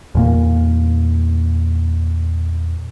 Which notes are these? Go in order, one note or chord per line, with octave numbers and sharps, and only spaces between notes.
E2 A#2 A#3